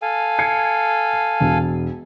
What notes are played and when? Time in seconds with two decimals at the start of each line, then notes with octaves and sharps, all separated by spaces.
0.02 A4 F5 G#5
0.39 G#6 C7 C#7
1.40 E1